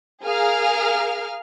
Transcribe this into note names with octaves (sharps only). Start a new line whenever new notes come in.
G#4 A#4 F5 F6